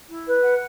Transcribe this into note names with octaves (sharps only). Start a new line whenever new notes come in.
E4
B4
F#5